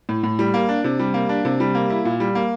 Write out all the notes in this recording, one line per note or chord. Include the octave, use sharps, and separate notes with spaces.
A2
A2
G3
A#3
D4
C3
G3
A#3
D4
C3
G3
A#3
E4
A#2
G3
A#3